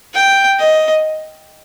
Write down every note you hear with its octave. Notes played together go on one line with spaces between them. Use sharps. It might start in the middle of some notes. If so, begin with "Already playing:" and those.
G5
D#5